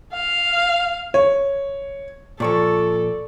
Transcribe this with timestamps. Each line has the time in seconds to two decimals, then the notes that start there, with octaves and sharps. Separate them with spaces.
0.13 F5
1.14 C#5
2.40 A#2 F3 A4 D5 C#6